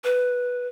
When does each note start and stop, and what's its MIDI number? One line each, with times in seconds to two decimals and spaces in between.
0.04 0.67 71